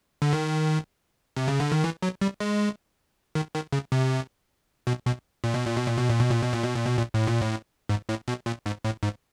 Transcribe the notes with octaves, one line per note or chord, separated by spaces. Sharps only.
D3
D#3
C3
C#3
D3
D#3
E3
F#3
G3
G#3
D#3
D#3
C#3
C3
B2
B2
A#2
B2
A#2
B2
A#2
B2
A#2
B2
A#2
B2
A#2
B2
A#2
B2
A#2
A2
A#2
A2
G#2
A2
B2
A#2
G#2
A2
G#2